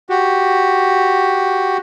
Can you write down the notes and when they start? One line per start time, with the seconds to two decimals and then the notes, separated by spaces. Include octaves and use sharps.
0.10 F#4 G4